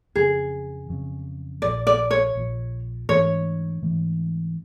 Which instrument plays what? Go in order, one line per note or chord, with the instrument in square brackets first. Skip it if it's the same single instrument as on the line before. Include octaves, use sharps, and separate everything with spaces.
[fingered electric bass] F2 C#3 F#3 [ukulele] G#4
[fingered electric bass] F2 C#3 F#3
[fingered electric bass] A#1 A#2 F3 [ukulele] D5
[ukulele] D5
C#5
[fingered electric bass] A#1 A#2 F3
[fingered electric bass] G#2 E3 A3 D4 [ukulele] C#5
[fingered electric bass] G#2 E3 A3 D4